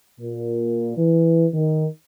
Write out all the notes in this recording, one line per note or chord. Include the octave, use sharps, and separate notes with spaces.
A#2
E3
D#3